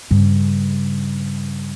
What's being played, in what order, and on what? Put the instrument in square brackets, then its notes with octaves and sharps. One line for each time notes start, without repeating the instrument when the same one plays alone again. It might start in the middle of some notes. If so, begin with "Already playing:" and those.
[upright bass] G2 C#3